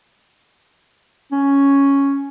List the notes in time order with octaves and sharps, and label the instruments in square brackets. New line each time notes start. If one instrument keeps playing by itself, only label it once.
[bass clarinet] C#4